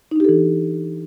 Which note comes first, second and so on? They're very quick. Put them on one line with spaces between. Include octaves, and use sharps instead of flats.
D#4 D4 G4 A4 E3